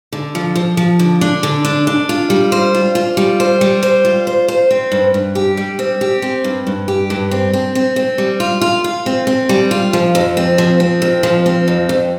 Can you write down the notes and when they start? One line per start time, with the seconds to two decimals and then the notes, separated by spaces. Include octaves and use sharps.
0.13 D3
0.35 F3
0.56 F3
0.77 F3
0.99 D3
1.21 D4
1.43 D3
1.65 D4
1.87 D4
2.09 F4
2.30 G3
2.52 C5
2.75 F4
2.95 F4
3.17 G3
3.40 C5
3.61 G3
3.83 C5
4.05 F4
4.27 C5
4.48 C5
4.71 C4
4.92 G2
5.14 G2
5.35 G4
5.57 G3
5.79 C4
6.01 G4
6.22 C4
6.44 G2
6.67 G2
6.88 G4
7.10 G2
7.31 C4
7.53 C4
7.75 C4
7.96 C4
8.18 G3
8.40 F4
8.61 F4
8.84 F4
9.06 C4
9.27 C4
9.49 G3
9.71 F4
9.93 F3
10.15 F2
10.37 C4
10.58 F3
10.80 C4
11.02 F2
11.23 F3
11.46 C4
11.68 F2
11.89 F2